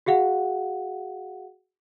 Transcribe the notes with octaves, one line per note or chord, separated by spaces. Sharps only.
F#4 G#4 F5 F#5